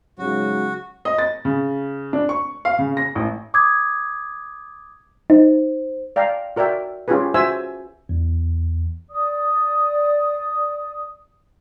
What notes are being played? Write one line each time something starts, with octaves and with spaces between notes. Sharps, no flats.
G#2 C#3 F#3 F#4
D#5
A6
C#3
D4
C#6
F5
C#3
A#6
A1
D6 D#6 G#6
D#4 C5
D5 F5 G5 A#5
F#4 A#4 D5 E5 G5
C#4 F4 G4 G#4 B4
F#4 C5 E5 G#5 E6
E2
D5 D#6